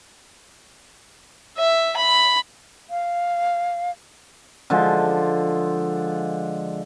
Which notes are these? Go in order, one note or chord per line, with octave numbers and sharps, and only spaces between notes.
E5
B5
F5
D3 F3 G#3